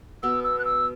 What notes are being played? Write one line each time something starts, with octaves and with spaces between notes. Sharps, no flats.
B2 B3 E6
E6
F#6
E6